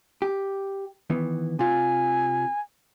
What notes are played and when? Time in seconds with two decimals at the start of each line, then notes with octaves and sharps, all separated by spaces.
0.22 G4
1.10 D#3 E3 B3
1.59 C3 F4 G#5